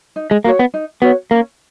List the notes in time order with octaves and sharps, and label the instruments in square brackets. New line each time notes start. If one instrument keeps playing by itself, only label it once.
[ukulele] D#4
[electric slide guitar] G#3
[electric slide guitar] A#3 [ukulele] F#4 C#5
[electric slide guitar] B3
[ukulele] D#4
[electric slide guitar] B3 [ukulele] F#4 C#5
[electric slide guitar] A#3 [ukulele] C#4